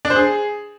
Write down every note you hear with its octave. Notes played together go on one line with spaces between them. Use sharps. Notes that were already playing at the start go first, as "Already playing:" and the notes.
D4
C5
G#4